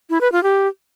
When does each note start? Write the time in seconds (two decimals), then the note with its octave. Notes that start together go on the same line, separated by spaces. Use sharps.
0.10 E4
0.21 B4
0.32 F4
0.43 G4